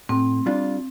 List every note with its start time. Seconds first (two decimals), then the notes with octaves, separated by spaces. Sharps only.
0.09 A2 C4
0.46 G3 D4 F4